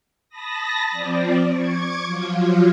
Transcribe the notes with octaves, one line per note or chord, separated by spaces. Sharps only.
A5 B5 D#6 A#6
F3 C4 D5
C#6 D6 G#6
F3 F#3 F4